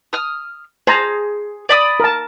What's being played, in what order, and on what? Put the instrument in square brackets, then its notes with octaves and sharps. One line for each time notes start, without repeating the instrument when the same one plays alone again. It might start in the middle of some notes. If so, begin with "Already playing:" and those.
[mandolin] D#6 F6
[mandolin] G#4 [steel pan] C5 A5 A#5
[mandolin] D5 B5 D#6
[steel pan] A#4 A5